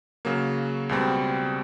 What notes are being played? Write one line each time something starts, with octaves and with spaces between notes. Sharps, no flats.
C#3 F#3 A#3
C#2 B2 G3 C4